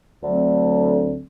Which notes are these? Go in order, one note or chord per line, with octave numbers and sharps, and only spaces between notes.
D2 D3 F#3 A3 C4